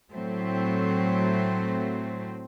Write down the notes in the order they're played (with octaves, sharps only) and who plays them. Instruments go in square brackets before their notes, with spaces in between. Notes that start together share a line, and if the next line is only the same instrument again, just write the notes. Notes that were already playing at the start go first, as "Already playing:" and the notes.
[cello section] A2 F#3 A3 C4